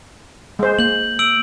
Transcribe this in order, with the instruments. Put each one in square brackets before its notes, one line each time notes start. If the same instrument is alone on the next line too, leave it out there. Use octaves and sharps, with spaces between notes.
[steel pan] G#3 C5
[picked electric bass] A#3 [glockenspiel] G6 F#7
[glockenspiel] E6 D7 F#7